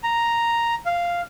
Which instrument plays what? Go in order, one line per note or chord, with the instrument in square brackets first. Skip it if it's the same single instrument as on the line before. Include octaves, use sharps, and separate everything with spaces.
[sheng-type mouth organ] A#5
F5